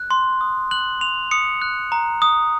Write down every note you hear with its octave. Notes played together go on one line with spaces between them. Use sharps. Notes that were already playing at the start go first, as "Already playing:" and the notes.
Already playing: F#6
C6
D#6
F#6 F#7
C6 F7
D#6 C#7
F#6
A#5
D#6